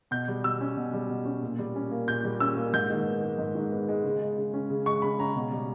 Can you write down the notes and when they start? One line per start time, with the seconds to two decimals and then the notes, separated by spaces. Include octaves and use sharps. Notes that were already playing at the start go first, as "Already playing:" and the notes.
0.11 B2 G6
0.28 G3
0.44 B2 E6
0.61 C#4
0.76 B2
0.93 G3
1.09 B2
1.25 C#4
1.42 A#2
1.59 G3
1.76 C#4
1.91 A#3
2.08 A#2 G6
2.25 G3
2.40 C#4 E6
2.57 A#3
2.73 G#2 G6
2.90 D#3
3.07 B3
3.22 G#3
3.38 G#2
3.55 D#3
3.72 B3
3.88 G#3
4.04 C#3
4.21 G#3
4.37 C#3
4.54 C#4
4.70 C#3
4.86 G#3 C#6
5.02 C#3 B5
5.19 C#4 A#5
5.36 B2
5.52 G3